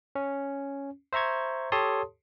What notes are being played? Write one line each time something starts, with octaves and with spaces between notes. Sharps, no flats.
C#4
C5 E5 A#5 C#6 G#6
G4 A4 C#5 A5 C6 D#6